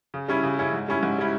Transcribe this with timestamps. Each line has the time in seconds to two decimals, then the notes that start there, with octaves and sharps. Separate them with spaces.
0.14 C#3
0.29 G3 C#4 E4
0.43 C#3
0.58 G3 C#4 E4
0.73 G#2
0.88 G3 C#4 E4
1.03 G#2
1.18 G3 C#4 E4